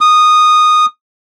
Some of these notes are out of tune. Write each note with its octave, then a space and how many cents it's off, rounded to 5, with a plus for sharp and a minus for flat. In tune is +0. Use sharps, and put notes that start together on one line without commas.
D#6 -15